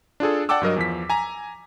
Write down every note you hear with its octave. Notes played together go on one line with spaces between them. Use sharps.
D4 F4 G#4 A4
D5 F#5 G5 A5 D6 E6
G2 F#3 A#4 D#5
E2 F3 B6
G#5 A#5